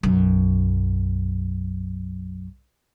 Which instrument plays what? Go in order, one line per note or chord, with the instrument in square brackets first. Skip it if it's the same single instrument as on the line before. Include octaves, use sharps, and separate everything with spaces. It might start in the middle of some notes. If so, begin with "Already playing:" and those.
[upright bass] B1 F#2